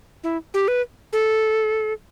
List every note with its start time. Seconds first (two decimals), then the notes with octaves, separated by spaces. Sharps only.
0.24 E4
0.54 G4
0.68 B4
1.13 A4